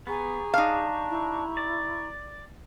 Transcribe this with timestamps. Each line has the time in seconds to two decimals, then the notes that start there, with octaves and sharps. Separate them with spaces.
0.07 B3 G4 G#4 A#5 C#6
0.54 D4 D#4 F5
1.09 E4
1.57 D5